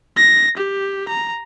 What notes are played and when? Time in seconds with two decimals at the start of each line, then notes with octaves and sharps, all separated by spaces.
0.17 A#6
0.57 G4
1.08 A#5